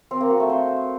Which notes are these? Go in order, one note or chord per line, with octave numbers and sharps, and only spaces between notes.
C4
A#3
F#4
A3
C5